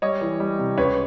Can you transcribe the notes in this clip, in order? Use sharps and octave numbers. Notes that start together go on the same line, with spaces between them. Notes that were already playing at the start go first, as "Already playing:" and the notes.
G3 C#5 D#5
E3
G3
C3
C#2 B4 C#5